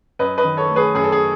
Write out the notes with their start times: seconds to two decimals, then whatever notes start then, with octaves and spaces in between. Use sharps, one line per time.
0.19 F#2 B4 D#5
0.38 B4 D#5
0.44 D#3
0.57 A4 C#5
0.70 A3
0.76 G#4 B4
0.95 F#2 G#4
1.04 A4
1.12 G#4